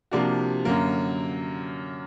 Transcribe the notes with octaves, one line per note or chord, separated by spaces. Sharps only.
C3 F3 A#3 D4 F#4
F#2 D3 F#3 A#3